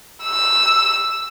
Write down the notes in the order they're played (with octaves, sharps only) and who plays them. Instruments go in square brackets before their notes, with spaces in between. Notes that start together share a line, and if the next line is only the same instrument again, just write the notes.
[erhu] E6